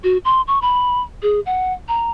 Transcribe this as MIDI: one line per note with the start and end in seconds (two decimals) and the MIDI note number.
0.04 0.18 66
0.25 0.42 84
0.48 0.61 85
0.62 1.01 83
1.22 1.40 68
1.46 1.73 78
1.88 2.11 82